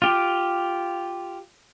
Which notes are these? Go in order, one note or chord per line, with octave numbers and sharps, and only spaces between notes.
F4 G4